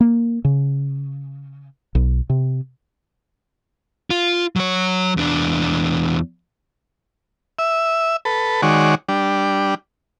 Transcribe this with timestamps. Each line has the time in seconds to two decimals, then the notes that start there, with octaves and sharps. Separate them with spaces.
0.01 A#3
0.45 C#3
1.95 B1
2.30 C3
4.10 F4
4.56 F#3 C#5
5.17 E2 D4
7.59 E5
8.25 A4 B4
8.62 D#3 G#3 F#4 C#5 D5
9.09 G3 D4